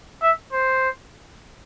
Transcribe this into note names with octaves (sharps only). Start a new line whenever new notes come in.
E5
C5